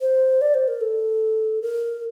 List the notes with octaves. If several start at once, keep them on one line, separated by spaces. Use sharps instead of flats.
C5
D5
C5
A#4
A4
A#4